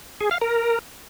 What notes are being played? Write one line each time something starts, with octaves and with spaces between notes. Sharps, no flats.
G#4
F5
A#4